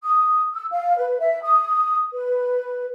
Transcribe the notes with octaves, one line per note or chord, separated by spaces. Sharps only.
D#6
E6
F5
B4
E5
D#6
B4